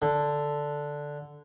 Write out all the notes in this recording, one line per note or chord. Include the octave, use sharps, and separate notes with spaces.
D3